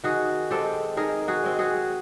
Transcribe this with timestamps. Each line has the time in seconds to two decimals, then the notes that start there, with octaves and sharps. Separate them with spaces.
0.04 D#3 F#4 G#4
0.50 G#3 C4 G4 A4
0.97 D#3 G#4 A#4
1.28 F#4 G#4
1.44 G#3 C4
1.59 F#4 G#4